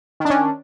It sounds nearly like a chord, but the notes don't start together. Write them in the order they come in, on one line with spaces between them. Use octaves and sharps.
D#3 D4 C#4